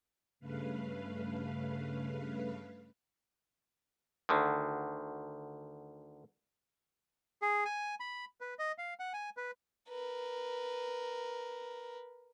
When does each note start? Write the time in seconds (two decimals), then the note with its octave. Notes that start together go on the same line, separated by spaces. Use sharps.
0.40 G2 C#3 A3 B4 F5
4.29 D2 D3 D#3
7.42 G#4
7.65 G#5
8.00 B5
8.41 B4
8.59 D#5
8.78 F5
8.99 F#5
9.13 G#5
9.37 B4
9.88 A#4 B4